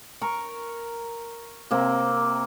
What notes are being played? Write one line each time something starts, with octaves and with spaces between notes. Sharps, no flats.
A#4 A#5 C#6
C3 A#3 C4